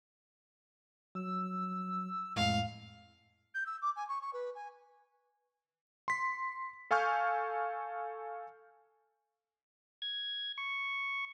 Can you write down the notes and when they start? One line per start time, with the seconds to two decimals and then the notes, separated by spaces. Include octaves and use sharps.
1.15 F#3 E6
2.36 F2 A2 G#3 F5
3.54 G6
3.66 E6
3.81 D6
3.95 G#5
4.08 C#6
4.21 C#6
4.33 B4
4.55 G#5
6.08 C6 B6
6.91 A4 F5 G#5 C#6 F6 G6
10.02 G#6
10.58 C#6